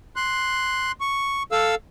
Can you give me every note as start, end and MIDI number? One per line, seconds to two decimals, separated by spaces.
0.16 0.92 84
0.16 0.92 90
1.01 1.43 85
1.52 1.75 69
1.52 1.75 77
1.52 1.75 88